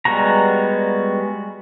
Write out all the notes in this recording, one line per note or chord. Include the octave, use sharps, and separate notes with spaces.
G3 G#3 B3 F#4 A#5